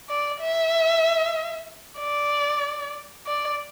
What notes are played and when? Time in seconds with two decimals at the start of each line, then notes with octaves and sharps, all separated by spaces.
0.09 D5
0.41 E5
1.99 D5
3.27 D5